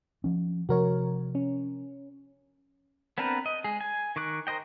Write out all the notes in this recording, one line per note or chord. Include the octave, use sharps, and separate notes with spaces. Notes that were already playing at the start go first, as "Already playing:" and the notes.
F3 C#4
C3 F3 F#4 A#4 C#5
C#4
B3 C4 D4 A#4 B4
D#5
G#3 G#4
G#5
D#3 C#6 D6 F#6
A#4 C5 D#5 G5